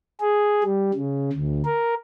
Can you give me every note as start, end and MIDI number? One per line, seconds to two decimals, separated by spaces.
0.21 0.63 68
0.64 0.92 55
0.94 1.30 49
1.33 1.62 38
1.65 1.94 70